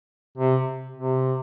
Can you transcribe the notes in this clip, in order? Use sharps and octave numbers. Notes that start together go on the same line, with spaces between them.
C3
C3